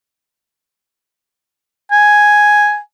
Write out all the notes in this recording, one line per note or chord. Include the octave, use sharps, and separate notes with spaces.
G#5